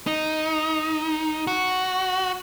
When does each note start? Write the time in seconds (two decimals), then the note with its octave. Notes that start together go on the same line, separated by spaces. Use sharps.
0.07 D#4
1.47 F#4